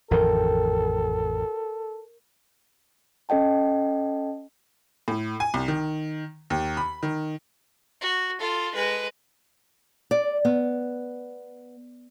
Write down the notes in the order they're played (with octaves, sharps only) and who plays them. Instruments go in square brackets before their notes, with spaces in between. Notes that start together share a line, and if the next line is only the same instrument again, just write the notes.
[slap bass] A1 F2 D#3 [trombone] A4 [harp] A#4 G5
[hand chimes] C#4 A4 D#5 G5 A5
[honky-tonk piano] A2
G#5
C2
D#3
D#2
B5
D#3
[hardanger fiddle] F#4
F4 A4
G#3 B4
[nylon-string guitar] D5
B3